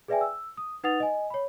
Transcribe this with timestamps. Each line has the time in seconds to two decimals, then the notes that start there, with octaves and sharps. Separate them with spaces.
0.08 G#4 B4 D5 E5 G5 G#5
0.21 E6
0.57 D#6
0.84 D#4 B4 F#5 D#6 A6 F7
1.00 D#5 G#5
1.30 C#5 B5